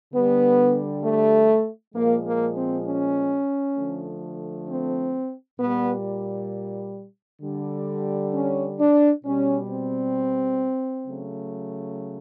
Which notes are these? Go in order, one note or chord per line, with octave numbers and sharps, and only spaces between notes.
D3 G3 B3
A3
A#2 F3 G#3 A#3
A#3
C4
C#4
D3 F3 A3
C4
A#2 G3 B3
D3 G3
C#4
D4
B2 G3 C#4
C4
C#3 F#3 A3